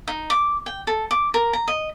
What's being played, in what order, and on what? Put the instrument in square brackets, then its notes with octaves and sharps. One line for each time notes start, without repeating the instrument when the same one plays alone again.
[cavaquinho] D#4
D6
G5
A4
D6
A#4
A#5
D#5